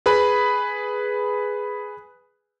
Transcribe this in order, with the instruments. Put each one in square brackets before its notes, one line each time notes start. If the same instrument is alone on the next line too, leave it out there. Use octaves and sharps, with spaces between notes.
[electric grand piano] G#4 B4 B5